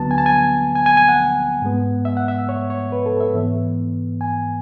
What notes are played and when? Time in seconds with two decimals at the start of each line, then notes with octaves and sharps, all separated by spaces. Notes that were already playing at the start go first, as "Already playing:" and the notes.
Already playing: D2 D3 F#3 B3 A5
0.11 G#5
0.18 A5
0.26 G#5
0.75 G#5
0.86 G#5
0.97 G#5
1.09 F#5
1.62 G#2 G#3 B3
2.05 E5
2.17 F#5
2.28 E5
2.49 C#5
2.70 C#5
2.92 B4
3.06 A4
3.20 E5
3.34 G#2 E3 B3
4.21 G#5